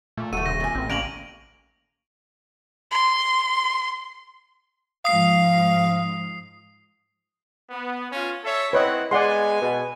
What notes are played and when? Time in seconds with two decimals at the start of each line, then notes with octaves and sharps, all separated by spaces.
0.17 A#2 A3
0.33 D#1 A3 F#4 A4 D#7
0.46 C3 A#6
0.60 A#2 G#5
0.75 A1 C4
0.90 D3 A#3 C#4 F5 D7 F7 F#7
2.91 C6
5.05 G#2 F3 F5 D#6 C7
7.70 B3
8.12 C#4 F4
8.44 A4 C#5 E5
8.73 C4 E4 B4 C#5 D#5 F#5
9.11 G#3 B3 D5 F#5 G#5 C6
9.61 B2